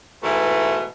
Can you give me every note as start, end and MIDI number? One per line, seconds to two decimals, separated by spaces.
0.24 0.86 44
0.24 0.86 47
0.24 0.86 52
0.24 0.86 57